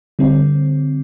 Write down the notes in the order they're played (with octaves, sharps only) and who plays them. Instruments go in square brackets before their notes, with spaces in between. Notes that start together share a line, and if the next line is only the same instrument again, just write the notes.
[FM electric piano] D3 G3 C4